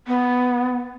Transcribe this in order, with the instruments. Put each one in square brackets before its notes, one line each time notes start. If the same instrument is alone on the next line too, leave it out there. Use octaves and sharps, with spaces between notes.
[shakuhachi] B3